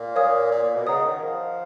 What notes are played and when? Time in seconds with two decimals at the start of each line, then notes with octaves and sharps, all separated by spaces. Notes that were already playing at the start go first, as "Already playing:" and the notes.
Already playing: A#2
0.16 A#4 C#5 F5 G#5 D#6
0.51 A#2
0.63 A#2
0.75 B2
0.87 C#3 D#5 F#5 A#5 D#6
1.05 D#3
1.22 F3